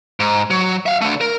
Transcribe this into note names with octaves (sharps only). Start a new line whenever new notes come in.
G#2
F#3
E5 F5
D3 A3
A#4